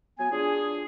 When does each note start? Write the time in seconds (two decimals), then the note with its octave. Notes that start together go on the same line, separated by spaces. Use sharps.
0.18 F#3 B3 G#5
0.31 D4 F4 G#4